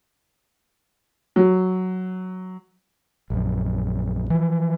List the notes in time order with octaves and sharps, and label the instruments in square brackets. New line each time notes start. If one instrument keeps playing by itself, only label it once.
[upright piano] F#3
[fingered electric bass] A#1 F#2
E3 F3